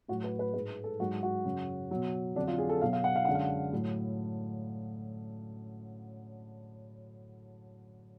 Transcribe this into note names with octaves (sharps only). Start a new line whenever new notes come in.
A2 F#3 F#4
B4
B4
G#2 G#3 B4
A4
G#2 F#3 F#4
F#4
F#2 C#3 F#3
B2 F#3
F2 D3 F#3 D4
F4
G#4
A4
B2 F#3 F5
F5
F#5
F5
F#2 D3 G#3 F#5
F5
A2 F#3